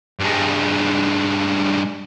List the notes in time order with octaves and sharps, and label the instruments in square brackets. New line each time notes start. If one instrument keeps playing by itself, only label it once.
[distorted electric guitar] G2 G#3